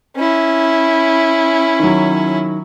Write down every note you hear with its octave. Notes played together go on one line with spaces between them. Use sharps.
C#4 E4
D#3 F#3